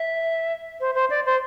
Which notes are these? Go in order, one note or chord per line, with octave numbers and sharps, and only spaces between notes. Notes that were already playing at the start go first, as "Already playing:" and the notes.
Already playing: E5
C5
C5
D5
C5